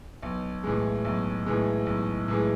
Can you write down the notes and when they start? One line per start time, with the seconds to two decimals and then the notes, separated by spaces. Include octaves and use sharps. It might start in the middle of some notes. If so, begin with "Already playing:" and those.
0.23 B1
0.64 A2 E3 G#3
1.05 B1
1.46 A2 E3 G#3
1.86 B1
2.28 A2 E3 G#3